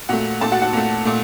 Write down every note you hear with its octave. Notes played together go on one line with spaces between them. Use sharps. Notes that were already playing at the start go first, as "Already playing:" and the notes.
A#2 A3 F#4 F#5
A#2 A3 A4 A5
F#4 F#5
F#4 F#5
A#2 A3
A#2 A3